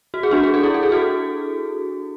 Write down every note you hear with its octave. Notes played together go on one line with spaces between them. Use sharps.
F#4
G#4
D4 F#4
G#4
A4
E4 G#4
A4
G#4
F#4 A4